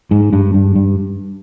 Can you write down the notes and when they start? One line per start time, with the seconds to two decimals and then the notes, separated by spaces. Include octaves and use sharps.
0.11 G#2
0.33 G2
0.54 G2
0.75 G2